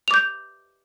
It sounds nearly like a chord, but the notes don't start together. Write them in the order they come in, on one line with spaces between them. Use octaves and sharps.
F7 D6 G6